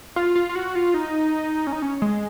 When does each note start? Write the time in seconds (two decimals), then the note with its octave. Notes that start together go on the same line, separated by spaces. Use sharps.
0.16 F4
0.35 F4
0.49 F4
0.55 F#4
0.75 F4
0.94 D#4
1.67 C#4
1.73 D#4
1.82 C#4
2.02 G#3